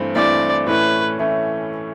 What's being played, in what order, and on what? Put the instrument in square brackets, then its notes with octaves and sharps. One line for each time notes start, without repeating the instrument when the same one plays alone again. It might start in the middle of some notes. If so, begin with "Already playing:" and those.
Already playing: [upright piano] G2 E3 A3 C4
[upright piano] G2 E3 A3 C4 [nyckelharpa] D5
[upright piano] A2 E3 A3 C#4 [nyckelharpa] B4
[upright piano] A2 E3 A3 C#4